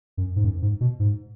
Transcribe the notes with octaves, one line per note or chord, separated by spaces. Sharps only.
F#2
G#2
F#2
G#2
B2
G#2